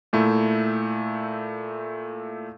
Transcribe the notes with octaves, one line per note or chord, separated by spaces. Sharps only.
A#2 A3 E4